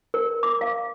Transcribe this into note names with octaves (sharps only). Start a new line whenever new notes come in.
A#4
D6
F5